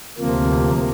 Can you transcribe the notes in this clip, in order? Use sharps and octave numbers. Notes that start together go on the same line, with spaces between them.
D2 C3 F3 A#3